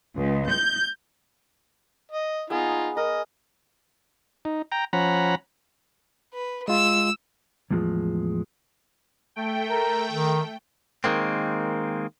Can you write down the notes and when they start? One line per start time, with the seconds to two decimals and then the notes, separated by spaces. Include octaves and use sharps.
0.16 C#2
0.51 G6
2.12 D#5
2.50 B3 D#4 F4 G#4 G#5
2.97 A#4 D#5
4.45 D#4
4.72 G5 A#5
4.93 F3 C#4 F#5 A#5 B5
6.33 B4
6.68 G#3 F4 E6
7.71 E2 A2 F3 G3 G#3
9.36 A3 G5
9.70 A#4
10.12 D#3
11.04 D#3 G#3 A#3 C4